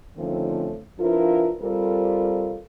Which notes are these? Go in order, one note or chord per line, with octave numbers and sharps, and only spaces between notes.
D3 D#3 F3 A3 C4 C#4
F3 D4 E4 F4 A#4 B4
G3 C4 F4 A4 A#4 C5